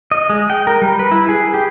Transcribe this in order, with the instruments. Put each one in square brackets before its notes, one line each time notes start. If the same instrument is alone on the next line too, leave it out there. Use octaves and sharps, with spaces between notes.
[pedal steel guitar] D#5
G#3
G5
A#4
G3
B4
E4
G#4
G4